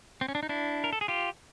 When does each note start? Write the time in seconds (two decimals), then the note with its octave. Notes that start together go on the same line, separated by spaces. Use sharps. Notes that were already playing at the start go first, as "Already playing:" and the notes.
0.21 C4
0.28 C#4
0.35 D4
0.43 D#4
0.49 D4 E4
0.84 A#4
0.93 A4
1.01 G#4
1.08 F4 G4